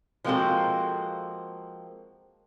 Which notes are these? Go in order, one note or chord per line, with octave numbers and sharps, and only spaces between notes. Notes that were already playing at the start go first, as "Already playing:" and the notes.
F3 G#3 A#3 C4 F#4 A4